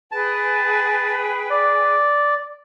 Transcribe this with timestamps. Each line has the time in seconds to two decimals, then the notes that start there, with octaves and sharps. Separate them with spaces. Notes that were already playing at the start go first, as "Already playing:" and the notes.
0.12 G#4 B4 G5 A5
1.50 D5